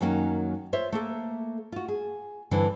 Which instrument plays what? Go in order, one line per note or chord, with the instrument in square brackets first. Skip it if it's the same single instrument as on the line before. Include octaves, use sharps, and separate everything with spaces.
[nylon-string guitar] F#2 D#3 F#3 A#3 C#4
F4 C5 C#5 E5
A3 A#3 A4
F4 F#4
G#4
G2 D3 E3 C4